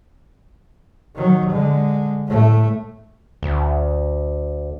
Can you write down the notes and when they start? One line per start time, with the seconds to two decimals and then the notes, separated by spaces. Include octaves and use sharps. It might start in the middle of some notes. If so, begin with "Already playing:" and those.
1.15 D#3 F#3
1.49 D3 G#3
2.27 A2 A3
3.43 D2